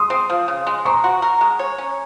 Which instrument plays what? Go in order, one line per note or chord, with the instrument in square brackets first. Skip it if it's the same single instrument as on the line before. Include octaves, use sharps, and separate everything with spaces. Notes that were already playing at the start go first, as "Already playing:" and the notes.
Already playing: [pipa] G#3 [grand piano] C6 D#6
[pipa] C4
F3
C#3
G#3
[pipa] C4 [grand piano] A#5 C#6
[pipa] F#4
A#4
G#3
C#5
C#4